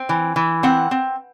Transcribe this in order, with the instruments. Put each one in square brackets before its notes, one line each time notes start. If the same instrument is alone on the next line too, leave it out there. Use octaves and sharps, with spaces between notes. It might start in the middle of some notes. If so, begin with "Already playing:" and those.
Already playing: [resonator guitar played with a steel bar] C4
E3
E3
C4 F#5
C4